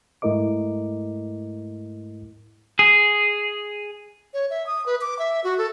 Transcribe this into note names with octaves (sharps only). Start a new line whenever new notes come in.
G#2 A3 E4 A#4 D#5 D6
G#4
C#5
E5
D#6
B4
D6
E5
F#4
A4